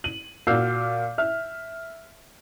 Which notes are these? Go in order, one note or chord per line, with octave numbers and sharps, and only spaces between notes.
D#7 F#7
A#2 F#4 E6 F6 G6 C7
E5 F6